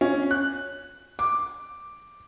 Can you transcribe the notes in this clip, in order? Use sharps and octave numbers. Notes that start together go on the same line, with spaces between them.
C#4
F#6
D6